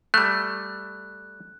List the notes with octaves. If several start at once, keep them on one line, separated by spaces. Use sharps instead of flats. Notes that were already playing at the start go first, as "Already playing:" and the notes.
G3 A3 F#6